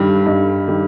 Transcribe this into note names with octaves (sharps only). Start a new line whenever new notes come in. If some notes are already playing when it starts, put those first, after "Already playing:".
Already playing: G2 D#3 G3
G2 D#4
D#3 G3